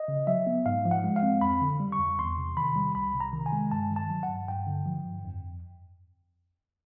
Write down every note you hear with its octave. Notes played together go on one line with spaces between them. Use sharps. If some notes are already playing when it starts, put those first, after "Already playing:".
Already playing: D#5
C#3
F#3 E5
B3
G#2 F5
F3
F#5
G#3
F5
C4
F2 B5
D3
G3
C#6
F2
E2 C6
C3
D#3 B5
G3
C2 B5
C3
A#5
D#3
G#5
G#3
G2 A5
D#3
A5
F#3
F#5
G2
G2 G5
D3
F3
G2
F2